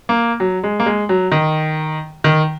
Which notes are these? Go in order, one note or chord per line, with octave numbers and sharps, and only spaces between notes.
A#3
F#3
G#3
A#3
G#3
F#3
D#3
D#3